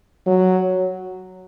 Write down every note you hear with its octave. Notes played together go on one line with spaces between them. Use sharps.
F#3